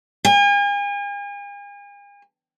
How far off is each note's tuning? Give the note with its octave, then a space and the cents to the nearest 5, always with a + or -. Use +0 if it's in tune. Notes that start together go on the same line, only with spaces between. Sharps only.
G#5 -40